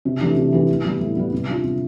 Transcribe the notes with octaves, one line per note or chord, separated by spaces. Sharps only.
C3
E3 A3 D4 G4
C3
E3 A3 D4 G4
A2
G3 B3
A2
G3 B3
C3
G3 D4 F4
C3